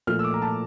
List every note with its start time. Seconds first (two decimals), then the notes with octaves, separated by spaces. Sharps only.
0.07 A#2 F3 A3 F6
0.19 E6
0.24 D6
0.34 A#5
0.42 A5